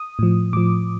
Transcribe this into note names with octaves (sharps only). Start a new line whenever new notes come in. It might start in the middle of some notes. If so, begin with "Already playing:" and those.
Already playing: D#6
A2 F3
A2 F3 D6